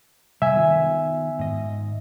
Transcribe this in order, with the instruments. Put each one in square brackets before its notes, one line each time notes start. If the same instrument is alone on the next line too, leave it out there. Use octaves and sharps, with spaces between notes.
[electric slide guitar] C3 G3 [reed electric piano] E5 G#5
[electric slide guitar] D#3 B3 F4
G#2 D#5